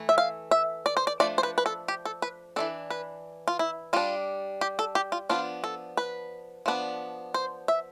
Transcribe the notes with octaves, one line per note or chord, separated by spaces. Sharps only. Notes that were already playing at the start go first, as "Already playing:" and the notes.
Already playing: E3 A3
E5
F5
E5
D5
C5
D5
F3 A3 D4 D5
C5
B4
B4
A4
G4
A4
B4
E3 A3 D4 A4
B4
F4
E4
G3 D4 F4
G4
A4
G4
F4
F3 B3 D4 F4
A4
B4
F3 B3 D4
C5
E5